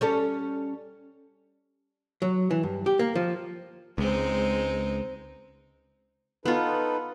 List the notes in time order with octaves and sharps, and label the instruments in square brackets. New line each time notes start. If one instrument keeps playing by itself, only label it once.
[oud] G3 C#4 A4
[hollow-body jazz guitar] F#3
E3
G2
G4
A#3
F3
[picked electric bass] C#2 [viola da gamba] G#3 C4 D#4
[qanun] B3 F4 [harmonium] D#4 A4 B4